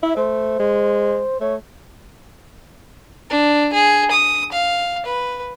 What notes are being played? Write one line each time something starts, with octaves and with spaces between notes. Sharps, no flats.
E4 E5
A3 C5
G#3
A3 C#5
D4
G#4
D#6
F5
B4